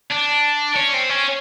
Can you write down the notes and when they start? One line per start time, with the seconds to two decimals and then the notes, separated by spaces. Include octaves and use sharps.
0.11 D4
0.76 C#4
0.94 C4
1.10 C#4